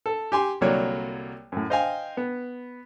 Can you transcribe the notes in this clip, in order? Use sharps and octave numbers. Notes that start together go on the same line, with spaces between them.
A4
G4 G#5 C6
C2 D3 F#3 A#3 C#5 D5
F#2 A2
C5 D#5 F5 G5 G#5
B3